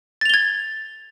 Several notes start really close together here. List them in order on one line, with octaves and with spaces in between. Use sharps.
A6 F7 G7 G#6